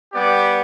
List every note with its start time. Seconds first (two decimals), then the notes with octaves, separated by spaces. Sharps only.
0.13 G3 B3 G4 D5